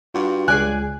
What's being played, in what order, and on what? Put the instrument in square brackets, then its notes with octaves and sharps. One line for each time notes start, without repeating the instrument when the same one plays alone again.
[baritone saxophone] G2 [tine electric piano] F4 F#4
[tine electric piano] C#2 [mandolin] G#4 D5 G#5 [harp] F#6